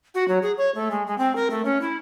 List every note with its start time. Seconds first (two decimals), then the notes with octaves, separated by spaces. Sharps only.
0.15 F#4
0.28 F#3
0.42 G#4
0.58 C#5
0.75 A3
0.91 G#3
1.07 G#3
1.18 C4
1.36 A#4
1.50 A3
1.65 C#4
1.81 E4